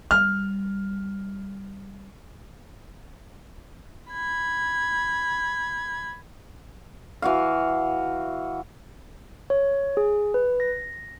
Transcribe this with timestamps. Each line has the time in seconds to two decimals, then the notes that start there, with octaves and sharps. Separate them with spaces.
0.11 G3 F6
4.12 B5 G#6
7.22 E3 F#4 F5
9.50 C#5
9.97 G#4
10.34 B4
10.60 A#6